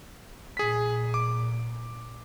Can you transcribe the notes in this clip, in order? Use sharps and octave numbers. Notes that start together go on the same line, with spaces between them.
A#2 G#4 B6
D6